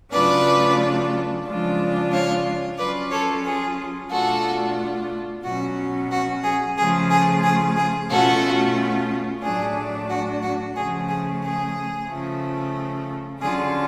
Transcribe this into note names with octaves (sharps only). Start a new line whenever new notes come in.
C#3 F#3 A3 D4 F4 B4 D5
C#3 F3 G#3 D4 F4
C#5 F5
F#3 C#4 F4 B4 D5
A4 C#5
G#4
B2 A3 D4 F4 F#4 A4
B2 F#3 C#4 F#4
F#4
G#4
C#3 F3 A3 F4 G#4
G#4
G#4
G#4
B2 A3 C#4 F4 F#4 A4
A2 F#3 A3 D4 G#4
F#4
F#4
C#3 F3 A3 G#4
G#4
G#4
C#3 F3 A3
D3 F#3 C#4 F4 G#4